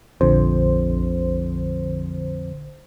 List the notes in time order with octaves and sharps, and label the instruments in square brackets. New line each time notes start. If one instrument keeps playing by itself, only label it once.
[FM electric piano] A#1 D3 C5 [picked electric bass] F2